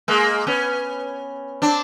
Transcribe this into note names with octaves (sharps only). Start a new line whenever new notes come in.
G#3 A#3
B3 C#4
C4 D4